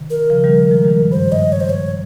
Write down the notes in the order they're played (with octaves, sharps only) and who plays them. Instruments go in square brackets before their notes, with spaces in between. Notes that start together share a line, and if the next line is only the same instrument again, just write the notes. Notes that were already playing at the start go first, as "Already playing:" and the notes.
Already playing: [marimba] C3 D#3
[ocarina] A#4
[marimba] C#3 F3
D#3 G3
F3 G#3
D#3 G3
G#2
[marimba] G2 [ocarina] C5
[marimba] G2 [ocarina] D#5
[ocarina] C#5
C5
C#5